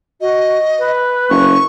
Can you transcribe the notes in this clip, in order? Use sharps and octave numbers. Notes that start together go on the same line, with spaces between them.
F#4 D#5
B4
F#1 C#6